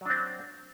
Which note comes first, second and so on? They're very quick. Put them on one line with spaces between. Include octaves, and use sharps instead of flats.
F#3 D4 C4